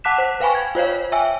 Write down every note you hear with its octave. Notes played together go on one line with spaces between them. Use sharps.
F#5 A5 D6 F#6 B6 E7
C5
B4 F5 G5 G#5 B5 C#6
G#6
F4 C5 C#5 F5
E5 G5 G#5 E6